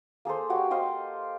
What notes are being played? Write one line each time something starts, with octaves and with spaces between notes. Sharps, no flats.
A#3 G#4 A4 C5
F#4 G4 C#5 F5
G4 C5 D#5 F5